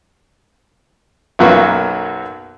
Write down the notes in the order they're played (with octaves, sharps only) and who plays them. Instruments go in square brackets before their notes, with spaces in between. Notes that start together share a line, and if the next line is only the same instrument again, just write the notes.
[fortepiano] B1 F#2 F#3 A#3 B3 F#4